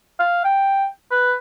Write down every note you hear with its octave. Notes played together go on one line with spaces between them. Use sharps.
F5
G5
B4